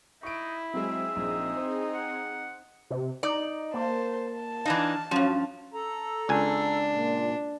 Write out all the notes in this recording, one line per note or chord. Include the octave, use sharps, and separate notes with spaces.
D#4 E4 C#6 D7
F#3 G#3 C4 G#4 E5
A#1 D#4
C5
F#5
C3
D#4 D5
A#3 C5 A5
A5
E3 D4 D#4 F5
G2 F3 F#3 C#4 F5
A4 A#5
C#2 D4 G#5
A#2